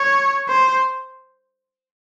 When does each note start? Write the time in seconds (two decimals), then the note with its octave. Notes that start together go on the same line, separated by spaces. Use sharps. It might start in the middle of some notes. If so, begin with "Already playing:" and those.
Already playing: C#5
0.49 C5